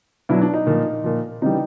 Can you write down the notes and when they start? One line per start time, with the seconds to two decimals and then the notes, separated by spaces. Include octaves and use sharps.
0.29 B2 F#3 D4 E4
0.42 D4
0.54 D#4
0.67 A#2 F3
1.04 A#2 F3
1.42 C#3 E3 G3 D#4